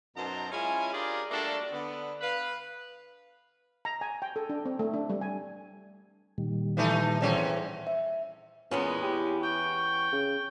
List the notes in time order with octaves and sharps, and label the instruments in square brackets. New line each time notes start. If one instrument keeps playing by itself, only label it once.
[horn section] F#2 B2 D#4 C5 A5 A#5
G#3 C#4 E4 F4 G#5
D4 F4 G4 G#4 A#4 D5
G3 A3 A#3 D4 F#4 A4
D3 B3
B4 F5
[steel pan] A#5
G#5
G5
A4
D4
C4
A3
D4
G3
G#5
[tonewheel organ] A#2 D#3 G3
[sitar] E3 A3 D#4
E2 C4 C#4
[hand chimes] E5
[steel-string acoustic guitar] E2 B3 C#4 [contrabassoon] A#2 [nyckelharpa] G#3
[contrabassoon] E3 [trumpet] G4
[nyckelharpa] G5 [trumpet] C#6
[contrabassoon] C#3